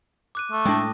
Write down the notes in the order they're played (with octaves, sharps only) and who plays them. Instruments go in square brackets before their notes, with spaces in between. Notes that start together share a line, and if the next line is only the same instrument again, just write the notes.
[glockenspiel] D6 F#6 D#7
[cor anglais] A3
[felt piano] A2 G5 A5 [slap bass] G#3 D4 [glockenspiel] D#6 A#6